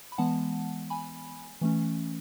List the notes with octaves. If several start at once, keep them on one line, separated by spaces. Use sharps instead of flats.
B5
E3 G#3 B3 F#5 A5
G#5 B5
E3 A3 C#4